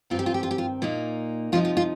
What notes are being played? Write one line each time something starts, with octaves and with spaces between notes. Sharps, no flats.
G2 D#3 C4 F4
G4
F4
G4
F4
G4
F4
A#2 A#3 D#4
C3 F3 D#4 F4
F4
F4